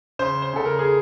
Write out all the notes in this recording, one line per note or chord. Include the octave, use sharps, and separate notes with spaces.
C#3 C5
C5
C#3 A4
A#4
G#4